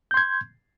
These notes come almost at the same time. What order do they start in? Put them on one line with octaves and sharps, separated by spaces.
G6 C6 G#6